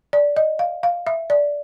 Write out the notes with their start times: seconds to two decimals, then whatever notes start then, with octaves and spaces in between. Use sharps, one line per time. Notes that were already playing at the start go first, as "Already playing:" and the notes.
0.13 D5
0.36 D#5
0.59 F5
0.83 F5
1.07 E5
1.30 D5